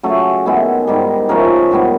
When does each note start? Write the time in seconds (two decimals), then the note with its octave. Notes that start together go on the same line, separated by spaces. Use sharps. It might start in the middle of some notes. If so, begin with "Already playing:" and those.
0.03 C#3 F#3 A3 A4
0.46 D#3 G#3 B3 E4
0.87 G#2 D#3 G3
1.29 C#3 F3 A3 A#4
1.71 G#2 D#3 G3 B3